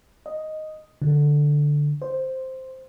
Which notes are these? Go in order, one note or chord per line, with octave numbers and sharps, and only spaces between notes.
D#5
D3
C5